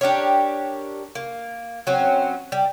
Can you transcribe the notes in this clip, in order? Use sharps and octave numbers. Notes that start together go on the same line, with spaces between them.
D4 G4 A#4 C#5
A#3
F#3 C4 C#4
G3